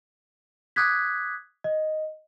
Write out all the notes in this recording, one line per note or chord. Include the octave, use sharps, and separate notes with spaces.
D6 D#6 F#6 G#6 B6
D#5